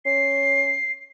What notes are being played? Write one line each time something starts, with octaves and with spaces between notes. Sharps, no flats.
C#4 C7